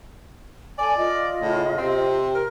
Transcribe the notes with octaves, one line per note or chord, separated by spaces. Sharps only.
A4 D5 G#5
F4 D#5
A2 C#3
C3 C4
A#4